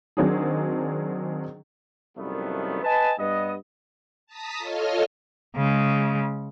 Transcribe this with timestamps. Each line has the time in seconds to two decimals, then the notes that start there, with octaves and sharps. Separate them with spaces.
0.17 D#3 F#3 C4 D4 D#4 G#4
2.17 C2 F#2 D#3 F3 A3 B3
2.84 B4 D#5 G#5 A5
3.19 G2 B3 D#5
4.26 A5 A#5 D#6 B6
4.57 F4 A4 C#5 D#5 F6
5.56 C#3 G#3